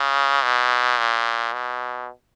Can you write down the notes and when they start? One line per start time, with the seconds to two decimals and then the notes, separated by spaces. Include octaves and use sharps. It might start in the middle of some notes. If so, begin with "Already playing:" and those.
Already playing: C#3
0.43 B2
0.98 A#2
1.53 B2